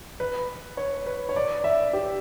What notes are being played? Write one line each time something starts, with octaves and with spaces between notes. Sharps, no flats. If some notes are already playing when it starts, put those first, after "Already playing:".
B4
C#5
B4
C#5
D5
E5
G4